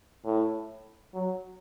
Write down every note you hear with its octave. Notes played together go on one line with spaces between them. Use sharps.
A2
F#3